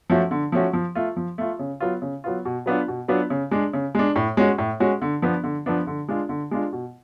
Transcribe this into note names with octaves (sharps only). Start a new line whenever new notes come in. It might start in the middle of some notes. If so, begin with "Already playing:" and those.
F3 A3 C#4 F#4
D3
F3 A3 C#4 F#4
F3
A3 F4
F3
A3 F4
C#3
F#3 B3 F4
C#3
F#3 B3 F4
B2
F#3 B3 D4 F4
B2
F#3 B3 D4 F4
C#3
G#3 D4
C#3
G#3 D4
A2
G#3 C#4 F#4
A2
G#3 C#4 F#4
D3
F3 B3 D4
D3
F3 B3 D4
D3
G#3 D4 F4
D3
G#3 D4 F4
B2